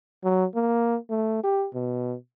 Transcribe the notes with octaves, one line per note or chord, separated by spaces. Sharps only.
F#3
A#3
A3
G4
B2